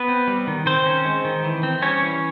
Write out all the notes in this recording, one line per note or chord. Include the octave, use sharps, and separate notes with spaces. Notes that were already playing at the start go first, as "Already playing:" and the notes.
Already playing: B3 B4
C4
G3
D#3
D#3 C4 C5
C#4
G#3
D#3
E3
C4
G3 C#4 C#5
E3